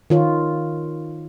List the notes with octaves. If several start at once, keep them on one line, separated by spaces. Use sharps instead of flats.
D#3 F4 C#5